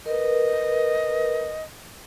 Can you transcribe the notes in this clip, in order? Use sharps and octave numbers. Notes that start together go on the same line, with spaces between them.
A#4 B4 D#5